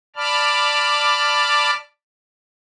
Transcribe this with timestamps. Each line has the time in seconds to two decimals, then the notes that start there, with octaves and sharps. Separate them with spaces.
0.16 D5 A5 B5 D6 F6